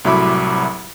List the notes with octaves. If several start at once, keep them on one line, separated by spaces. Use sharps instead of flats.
C2 A2 F#3 E5 B5 D6